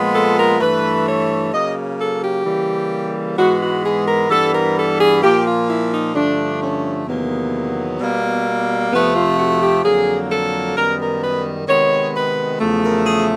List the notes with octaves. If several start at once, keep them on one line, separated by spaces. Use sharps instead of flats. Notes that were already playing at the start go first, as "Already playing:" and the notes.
Already playing: A#2 F3 G#3 B3
A4
A#4
G2 E3 A3 B4
C#5
C#3 F#3 A#3 D#5
A4
G4
C#3 E3 G3 A#3
G#2 E3 G#3 B3 F#4
F#4
G#4
A#4
G2 E3 G3 B3 A4
A#4
A4
G#4
A#2 F3 A#3 G4
F4
E4
D#4
G2 D3 F3 A3 D4
C#4
E2 C3 D#3 F#3 A#3 B3
B2 G3 A#3
F2 C3 F3 A3 B3
F4
F#4
G4
F2 D3 F#3 A#3 G#4
A4
F#2 D#3 G3 B3 A#4
A#4
B4
C3 D#3 G#3 B3 C#5
B4
E2 C#3 F3 A3
A#4
G#4